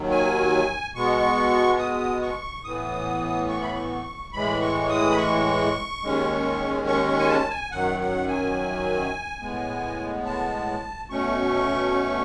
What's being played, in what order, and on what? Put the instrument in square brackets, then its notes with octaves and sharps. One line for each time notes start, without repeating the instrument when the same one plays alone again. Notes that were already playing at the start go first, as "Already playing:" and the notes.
Already playing: [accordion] D#2 D#3 F#3
G#5
B2 G#3 B3 C#6
D#6
C#6
A2 E3 B3 D#6
C#6
B5
C#6
A2 E3 G#3 B5
C#6
D#6
B5
C#6
D#2 D#3 G#3 C#4
C#6
C#6
G#5
A5
G#5
F#2 D#3 F#3 F#5
F#5
G#5
A2 G#3 B3
A5
B2 A3 C#4 C#6